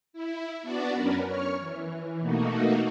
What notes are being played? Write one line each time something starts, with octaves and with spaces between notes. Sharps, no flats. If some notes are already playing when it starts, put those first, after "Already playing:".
E4
B3 D4 F#4 D5
F#2 C#4 A#4 B4
C#5 C#6 F6
E3
B2 A3 A#3 D#4 F#4